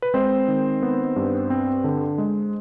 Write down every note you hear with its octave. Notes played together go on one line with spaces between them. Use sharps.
B4
G#3 C4 C5
D#3
B3
G2
C4
D3
G#3